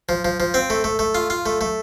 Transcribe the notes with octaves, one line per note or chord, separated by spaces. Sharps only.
F3
F3
F3
C4
A3
A3
A3
F4
F4
A3
A3